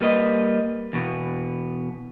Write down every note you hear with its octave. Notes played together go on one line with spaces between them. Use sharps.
G3 A#3 B4 D#5
E2 B2 B3